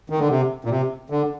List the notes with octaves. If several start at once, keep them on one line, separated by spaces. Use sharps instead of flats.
D#3
D3
C3
A#2
C3
D3